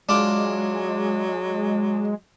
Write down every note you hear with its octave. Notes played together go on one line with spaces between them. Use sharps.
F#3 G#3 D4 F4 D6